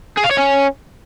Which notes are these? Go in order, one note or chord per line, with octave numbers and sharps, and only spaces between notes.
G#4
F5
C#5
C#4